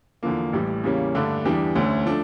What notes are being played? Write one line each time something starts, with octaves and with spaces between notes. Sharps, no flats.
E2 D3 F3 A#3
A1 A2 G3
E2 C#3 G3 A#3 C#4
G2 D3 A3 D4 G4
E2 E3 G3 D4 G4
D2 D3 A3 C#4
F3 A3 D4